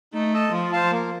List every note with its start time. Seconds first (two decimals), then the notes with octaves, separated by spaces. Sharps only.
0.14 A3 D#4
0.33 A4 D#5 A5
0.52 F3 F4
0.72 C5 F5 A5
0.91 A#3